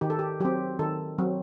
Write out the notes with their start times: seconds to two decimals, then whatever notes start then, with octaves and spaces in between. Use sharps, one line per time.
0.01 D#3 G4
0.10 A4
0.19 G4
0.40 F#3 C4 G4
0.79 D#3 A4
1.18 F#3 C4